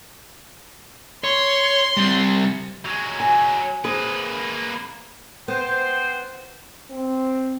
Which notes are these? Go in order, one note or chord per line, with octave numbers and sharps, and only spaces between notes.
C#5 C6
G3 C4
F#3 G#3
G#5
A#3 G#4 B4 C5
B3 C5 G5
C4